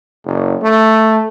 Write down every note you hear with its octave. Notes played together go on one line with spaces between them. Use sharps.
F#1
A3